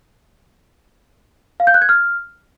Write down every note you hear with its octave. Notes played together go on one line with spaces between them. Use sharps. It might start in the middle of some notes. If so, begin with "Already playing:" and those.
F5
G6
F#6
G#6
F6